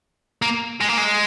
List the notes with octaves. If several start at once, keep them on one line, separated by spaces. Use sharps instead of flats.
A#3
G#3
A#3
G#3